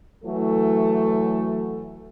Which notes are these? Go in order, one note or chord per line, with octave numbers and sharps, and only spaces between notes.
E3 F#3 A3 A4